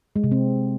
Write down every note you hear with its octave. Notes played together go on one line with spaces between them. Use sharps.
G#3
C3
C4